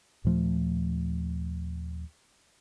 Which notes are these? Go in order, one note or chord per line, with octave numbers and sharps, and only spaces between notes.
D#2 A#2 F3 A3